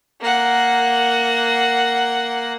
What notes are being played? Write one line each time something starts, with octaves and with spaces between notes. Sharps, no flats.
A#3 F#5